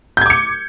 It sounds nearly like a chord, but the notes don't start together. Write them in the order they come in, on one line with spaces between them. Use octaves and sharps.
G6 G#6 D6 C#7